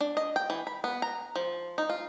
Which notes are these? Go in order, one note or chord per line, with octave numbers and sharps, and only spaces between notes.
D4
D#5
G5
E3
B5
B3
A#5
F3
D#4
F4